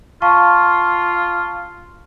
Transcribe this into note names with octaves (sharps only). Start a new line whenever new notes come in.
F4 F5 A5 C#6